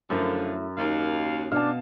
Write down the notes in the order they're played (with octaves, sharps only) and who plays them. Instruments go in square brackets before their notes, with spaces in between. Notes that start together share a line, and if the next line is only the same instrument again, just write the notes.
[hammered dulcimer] F#2 [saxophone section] D3 F3 [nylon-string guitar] A3 E4
[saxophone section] D#2 F5 [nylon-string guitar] D#4 A#4
[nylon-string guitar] B2 B3 [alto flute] D4 [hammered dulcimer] F5 A5